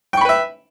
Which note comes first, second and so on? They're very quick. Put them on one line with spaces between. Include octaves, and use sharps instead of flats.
G5 C#6 B5 B4 E5